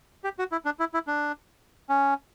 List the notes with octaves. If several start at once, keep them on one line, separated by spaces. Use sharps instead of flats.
G4
F#4
E4
D4
E4
E4
D4
C#4